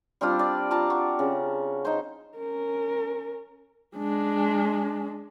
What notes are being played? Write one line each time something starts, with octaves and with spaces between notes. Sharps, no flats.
G3 C4 D4 F4
D5
F4 A5 A#5
F#4
C#3
D#4 C5
C#4 A#4
G#3 D4